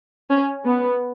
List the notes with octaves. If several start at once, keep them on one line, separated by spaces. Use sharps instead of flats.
C#4
B3